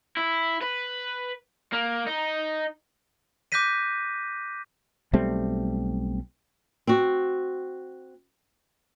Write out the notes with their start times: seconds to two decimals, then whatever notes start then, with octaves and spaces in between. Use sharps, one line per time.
0.17 E4
0.61 B4
1.73 A#3
2.07 D#4
3.52 D6 F#6 G6 A#6 B6 D#7
5.13 B1 G3 A3 C4
6.87 C4 F#4